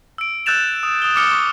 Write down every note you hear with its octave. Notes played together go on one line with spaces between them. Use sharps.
E6 D7
E6 F#6 G6 A6 E7 F7
D#6
D#6 G7
D6 D#6 F6 C#7 E7 G7
C#6